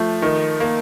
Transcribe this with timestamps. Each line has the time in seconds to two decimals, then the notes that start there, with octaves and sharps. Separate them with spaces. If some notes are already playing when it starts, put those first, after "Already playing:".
Already playing: F3 A3
0.22 D#3
0.60 A#3